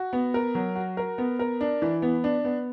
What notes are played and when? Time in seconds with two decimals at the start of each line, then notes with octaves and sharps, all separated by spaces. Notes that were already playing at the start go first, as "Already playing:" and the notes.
Already playing: F#4
0.13 B3
0.34 A#4
0.55 F#3
0.75 F#4
0.97 A#4
1.18 B3
1.39 A#4
1.61 D4
1.82 E3
2.02 B3
2.24 D4
2.45 B3